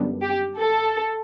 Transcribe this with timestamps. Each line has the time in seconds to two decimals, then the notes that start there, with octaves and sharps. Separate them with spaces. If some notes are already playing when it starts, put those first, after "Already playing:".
Already playing: F#2 D3 G3 B3 D4
0.22 G4
0.58 A4